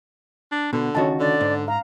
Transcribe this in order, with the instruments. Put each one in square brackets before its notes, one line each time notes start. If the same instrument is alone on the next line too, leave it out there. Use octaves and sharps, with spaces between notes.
[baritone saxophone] D4
[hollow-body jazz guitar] B2 [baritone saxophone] D3
[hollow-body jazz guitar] C#2 D#3 F#4 [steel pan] C#4 D#5 A5
[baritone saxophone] D3 [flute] D5
[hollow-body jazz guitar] G#2
[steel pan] F5 [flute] A#5